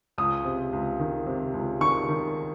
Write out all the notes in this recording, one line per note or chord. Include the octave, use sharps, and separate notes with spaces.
C#2 D#6
C3
C#2
D#3
C3
C#2
D#3 C#6
D#3